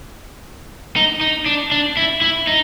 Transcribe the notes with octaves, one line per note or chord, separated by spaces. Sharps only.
D#4
D#4
D4
D4
E4
E4
D#4